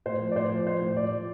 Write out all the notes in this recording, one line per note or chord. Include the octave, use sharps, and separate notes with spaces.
A2 C5
F3
D5
A2 C5
F3
F3 C5
A2
A2 D5
F3